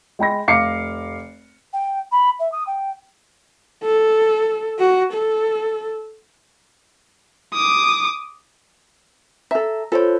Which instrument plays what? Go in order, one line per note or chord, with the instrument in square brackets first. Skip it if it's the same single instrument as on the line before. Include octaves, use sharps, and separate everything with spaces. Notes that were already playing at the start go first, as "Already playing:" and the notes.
[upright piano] G#3 G5 B5 A#6
F1 F5 D6 C7 C#7
[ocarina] G5
B5
E5
D#6
G5
[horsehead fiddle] A4
F#4
A4
[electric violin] D6 D#6
[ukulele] A4 E5 [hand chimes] A#5
[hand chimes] F4 C5 C#5 [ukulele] A4